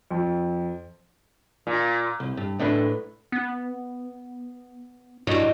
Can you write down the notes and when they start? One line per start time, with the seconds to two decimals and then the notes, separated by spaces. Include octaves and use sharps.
0.11 F2
1.67 A#2
2.20 C2
2.37 G2
2.59 A2 A3 D4 B4
3.32 B3
5.27 G2 F#3 G3 E4 F#4 D#5 C#6